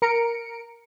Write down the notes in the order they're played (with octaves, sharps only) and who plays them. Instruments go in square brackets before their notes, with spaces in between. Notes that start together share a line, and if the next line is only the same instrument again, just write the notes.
[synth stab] A#4 A#5 C#7 D7